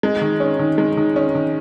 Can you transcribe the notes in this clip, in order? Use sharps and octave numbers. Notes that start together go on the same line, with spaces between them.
G#3
D#3
C#4
D#3
G#3
D#3
C#4
D#3